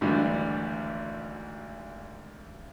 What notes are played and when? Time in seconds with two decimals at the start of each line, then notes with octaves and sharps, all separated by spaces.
0.01 G#1 D2 E3 G3 D4